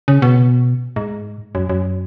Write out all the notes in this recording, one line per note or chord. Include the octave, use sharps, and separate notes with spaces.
C#3
B2
G#2
F#2
F#2